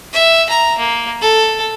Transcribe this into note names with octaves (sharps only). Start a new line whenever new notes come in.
E5
A#5
A#3
A4